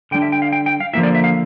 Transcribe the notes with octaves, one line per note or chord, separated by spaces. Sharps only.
D3 G3 D4 G5
E5
G5
F5
G5
G5
F5
D3 F3 A#3 E4 E5
D5
E5
F5